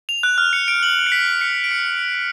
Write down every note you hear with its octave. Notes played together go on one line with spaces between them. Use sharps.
F7
F#6
F6
C#7
D7
F#7
C#7
B6
C#7
D7
C#7